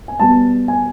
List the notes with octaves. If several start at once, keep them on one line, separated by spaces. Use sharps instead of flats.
G#5
B2 G3 B3 A5
G#5